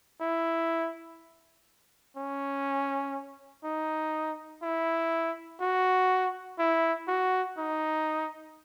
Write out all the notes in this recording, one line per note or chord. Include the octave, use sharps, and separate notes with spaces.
E4
C#4
D#4
E4
F#4
E4
F#4
D#4